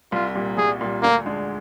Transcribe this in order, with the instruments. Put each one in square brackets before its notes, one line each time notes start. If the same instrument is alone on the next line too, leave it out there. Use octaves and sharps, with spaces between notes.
[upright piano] C2 [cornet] F4
[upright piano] A#2 G3
[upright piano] C2 [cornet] G#4
[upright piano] A#2 G3
[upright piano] D2 [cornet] A#3
[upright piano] D3 G#3 D4